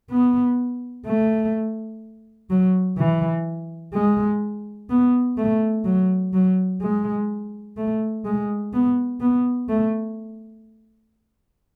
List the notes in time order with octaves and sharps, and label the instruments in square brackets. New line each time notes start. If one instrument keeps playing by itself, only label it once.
[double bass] B3
A3
F#3
E3
G#3
B3
A3
F#3
F#3
G#3
A3
G#3
B3
B3
A3